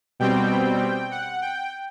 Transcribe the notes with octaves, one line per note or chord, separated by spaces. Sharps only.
B2 G3 C4 G5
F#5
G5